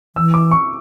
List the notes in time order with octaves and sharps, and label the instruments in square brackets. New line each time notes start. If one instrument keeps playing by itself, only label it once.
[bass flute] E3 [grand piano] E6
[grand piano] D6
C#6